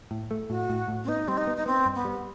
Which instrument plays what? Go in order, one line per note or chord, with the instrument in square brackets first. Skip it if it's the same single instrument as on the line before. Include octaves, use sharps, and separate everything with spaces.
[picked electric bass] A2
A3
[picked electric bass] A2 [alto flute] F#4
[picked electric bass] A2
A2
[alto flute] C4
[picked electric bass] B3 [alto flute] D#4
[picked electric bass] G3 [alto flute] C4
[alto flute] D#4
[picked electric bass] B3
[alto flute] D#4
[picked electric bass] B3 [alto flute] C4
[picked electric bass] G2
[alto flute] B3
[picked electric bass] G3